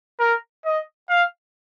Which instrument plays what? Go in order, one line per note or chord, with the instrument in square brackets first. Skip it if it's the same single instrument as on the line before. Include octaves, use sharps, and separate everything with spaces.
[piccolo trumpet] A#4
D#5
F5